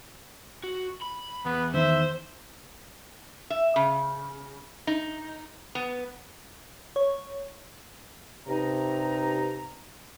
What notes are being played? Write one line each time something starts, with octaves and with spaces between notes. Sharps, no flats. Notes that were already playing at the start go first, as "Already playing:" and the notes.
F#4
B5
E2 B3
D#3 C5 E5
E5
C#3
D#4
B3
C#5
G2 C3 D#4 A#5